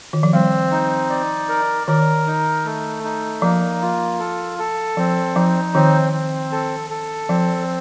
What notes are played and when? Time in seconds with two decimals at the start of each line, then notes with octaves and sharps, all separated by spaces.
0.13 D#3
0.23 F3
0.33 G3 C4
0.72 D#4
1.10 D5
1.49 A#4
1.87 D#3 A#4
2.27 D#4
2.65 A3
3.04 D#4
3.42 F3 A#3
3.82 F4
4.19 A4
4.59 A4
4.97 F3 C4
5.35 F3 D#4
5.74 D#3 C4
6.13 C4
6.52 A4
6.90 A4
7.29 F3 C4